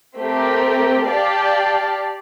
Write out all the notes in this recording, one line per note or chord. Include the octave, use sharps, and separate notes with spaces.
A3 C4 G4 A#4
G4 D5 F5 A5